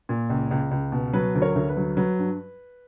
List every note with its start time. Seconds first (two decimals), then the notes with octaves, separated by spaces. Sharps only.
0.09 A#2
0.30 C#2
0.51 C#2
0.71 C#2
0.92 B2
1.13 F#3 B4
1.35 D2
1.42 A#4 C#5
1.55 D2
1.69 B4
1.77 F#3
1.97 F#3 B4
2.19 G2